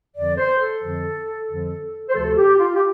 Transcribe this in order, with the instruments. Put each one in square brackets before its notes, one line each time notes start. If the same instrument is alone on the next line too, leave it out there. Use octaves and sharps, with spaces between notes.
[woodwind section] F2 D3 F3 D5
C5
A4
F2 D3 F3
F2 D3 F3
C5
D2 C3 F3 A3 A4
G4
F4
G4